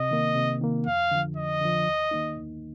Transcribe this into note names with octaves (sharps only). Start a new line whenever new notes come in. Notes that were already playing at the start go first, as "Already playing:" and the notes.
Already playing: C3 D#5
D#3 A#3
C3
D#3 A#3
F2 F5
D3 F3
F2 D#5
D3 F3
D#2
D#3 A#3 D#4
D#2